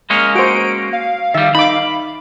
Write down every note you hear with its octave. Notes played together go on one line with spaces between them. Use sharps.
G#3 A#3 C#4 F6
F#4 C5 D7
F5
D#3 G3 E5
D#4 B5 D6